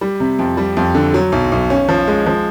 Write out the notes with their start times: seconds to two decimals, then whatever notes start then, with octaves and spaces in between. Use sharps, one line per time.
0.01 G3
0.20 C3
0.39 F2
0.57 G3
0.77 F2
0.95 D3
1.14 F#3
1.32 B1
1.52 B1
1.70 C#4
1.89 F3
2.08 G#3
2.26 F3